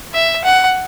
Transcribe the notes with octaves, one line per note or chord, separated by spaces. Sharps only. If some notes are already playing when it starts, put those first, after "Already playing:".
E5
F#5